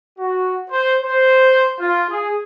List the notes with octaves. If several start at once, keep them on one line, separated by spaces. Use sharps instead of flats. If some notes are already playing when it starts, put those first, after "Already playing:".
F#4
C5
C5
F4
G#4